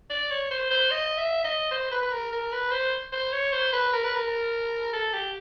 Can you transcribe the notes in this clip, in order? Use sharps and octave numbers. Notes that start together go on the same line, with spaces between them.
D5
C#5
C5
C5
D#5
E5
D#5
C5
B4
B4
A#4
A#4
B4
C5
C5
C#5
C5
B4
A#4
B4
A#4
A4
G4